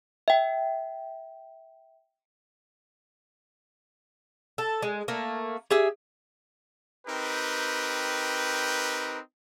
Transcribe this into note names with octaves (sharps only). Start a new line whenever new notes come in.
E5 G5
A4
G#3
A3 A#3
G4 G#4 E5
C4 D#4 G4 A#4 B4